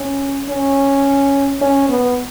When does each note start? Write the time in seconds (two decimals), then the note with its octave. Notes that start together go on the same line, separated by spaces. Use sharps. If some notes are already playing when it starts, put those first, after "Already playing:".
Already playing: C#4
0.49 C#4
1.61 C#4
1.89 B3